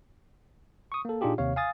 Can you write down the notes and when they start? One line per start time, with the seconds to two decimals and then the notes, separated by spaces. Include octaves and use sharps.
0.92 C#6 D#6
1.05 A#3 A4
1.21 A#2 D4 D#4 F4 G4 G#4
1.38 D#2 C3 C#5 F5
1.56 F5 G#5 D#6 A6